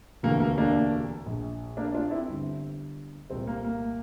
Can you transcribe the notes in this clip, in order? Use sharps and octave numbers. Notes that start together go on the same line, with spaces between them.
E1 D2 C3 E3 A#3
A#3
A#3 D4
A#1 A#2
A#3 D4
D4 F4
C4 E4
G1 G2 D3
C2 A#2 C4
A#3
A#3